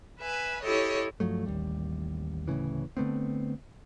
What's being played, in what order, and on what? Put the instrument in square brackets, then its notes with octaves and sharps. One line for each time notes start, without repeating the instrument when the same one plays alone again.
[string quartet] B4 E5 G#5
E4 G4 A4 C#5 D#5
[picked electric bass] G2 F3 F#3 A3
A1 D#2 A2 G3
D1 A2 C#3 E3
D3 A3 B3 C4